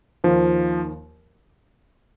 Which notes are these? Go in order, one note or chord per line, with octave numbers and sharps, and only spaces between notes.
D#2 D#3 F3 A#3 F4 C5